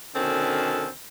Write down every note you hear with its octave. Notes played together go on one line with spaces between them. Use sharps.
B2 D3 D#3 C4 C#4 A4